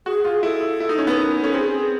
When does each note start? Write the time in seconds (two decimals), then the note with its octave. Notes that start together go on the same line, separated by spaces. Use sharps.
0.06 F#4 G#4
0.24 F4 G#4
0.43 E4 A4
0.80 E4
0.89 D#4
0.98 C#4
1.07 B3 B4
1.17 A#4
1.41 C#4 A4
1.53 C4 G#4
1.71 G#4